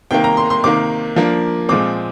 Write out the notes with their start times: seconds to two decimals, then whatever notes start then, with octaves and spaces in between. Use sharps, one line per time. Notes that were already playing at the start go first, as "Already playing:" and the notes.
0.11 C3 D#3 A#3 G5
0.24 A#5
0.37 C6
0.50 C6
0.64 C3 D#3 A#3 D6
1.16 F3 A#3 D4
1.69 A#2 F3 G#3 C4 D6